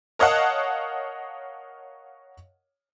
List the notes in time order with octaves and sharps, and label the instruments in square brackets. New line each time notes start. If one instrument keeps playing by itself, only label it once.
[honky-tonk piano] A#4 C#5 D#5 F5 F#5 A5